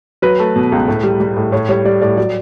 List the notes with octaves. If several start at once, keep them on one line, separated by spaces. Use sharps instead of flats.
F#3 B4
A3
B2
C#2
A2
G3
G3
A2
A2 C#5
G3 C#5
G3 D5
A2 D5
F#3 D5